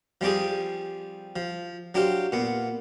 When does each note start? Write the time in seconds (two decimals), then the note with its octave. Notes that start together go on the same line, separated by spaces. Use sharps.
0.21 F3 G3 C4 G4 G#4
1.36 F3
1.95 F#3 D4 G4 C5 F5
2.32 A#2 B3